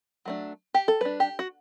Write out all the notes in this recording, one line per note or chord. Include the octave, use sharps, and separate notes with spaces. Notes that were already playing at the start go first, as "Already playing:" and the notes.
F#3 A3 D4
G4
A4
G3 D4 B4
G4
F#4